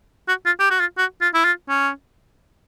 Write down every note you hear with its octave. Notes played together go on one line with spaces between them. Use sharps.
F#4
F4
G4
F#4
F4
F#4
F4
E4
F4
C#4